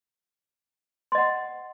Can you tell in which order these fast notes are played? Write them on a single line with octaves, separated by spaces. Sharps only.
C6 D#5 F#5